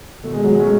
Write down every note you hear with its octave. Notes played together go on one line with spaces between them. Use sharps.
B2 A3
G#3
F#3
G#3
F#3 A3 C#4